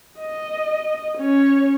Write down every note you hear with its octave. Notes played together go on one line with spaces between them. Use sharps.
D#5
C#4 C#5